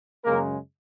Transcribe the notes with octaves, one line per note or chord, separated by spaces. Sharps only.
F#2 C#3 G#3 A#3 A#4